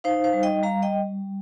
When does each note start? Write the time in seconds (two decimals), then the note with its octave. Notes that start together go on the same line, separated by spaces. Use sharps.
0.04 D#4 C5 F5
0.24 C5 F5
0.33 G3
0.43 D#5 G5
0.63 G3 F5 A#5
0.82 D#5 G5
0.93 G3